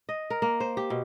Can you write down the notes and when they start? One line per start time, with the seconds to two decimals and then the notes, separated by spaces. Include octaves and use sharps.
0.09 D#5
0.30 A#4
0.42 A#3
0.60 C5
0.77 G4
0.90 B2